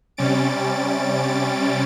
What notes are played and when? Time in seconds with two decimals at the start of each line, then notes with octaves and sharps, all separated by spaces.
0.17 C3 G3 C#4 A6 D7